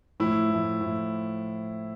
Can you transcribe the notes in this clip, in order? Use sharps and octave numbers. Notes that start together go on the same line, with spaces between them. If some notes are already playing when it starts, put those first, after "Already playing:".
A2 F3 E4
A2 F3
A2 F3